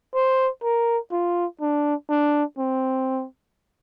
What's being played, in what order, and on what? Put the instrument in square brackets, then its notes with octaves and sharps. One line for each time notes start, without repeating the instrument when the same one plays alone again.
[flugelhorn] C5
A#4
F4
D4
D4
C4